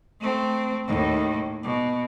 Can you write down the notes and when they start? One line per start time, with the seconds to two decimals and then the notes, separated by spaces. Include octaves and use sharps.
0.20 A3 C4
0.86 D#2 A2
1.63 B2